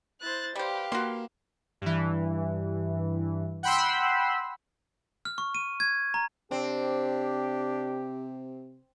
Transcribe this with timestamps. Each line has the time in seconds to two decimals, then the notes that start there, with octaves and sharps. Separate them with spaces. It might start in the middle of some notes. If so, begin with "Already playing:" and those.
0.21 E4 C5 F#6 A6
0.56 G3 G4 B4 C5 F5
0.92 A#3 F#4 C6
1.81 G2 E3
3.63 F#5 G5 B5 C6 E6
5.25 F6
5.38 C#6
5.55 D#7
5.80 G#6
6.14 A#5
6.51 C3 C4 D4 G4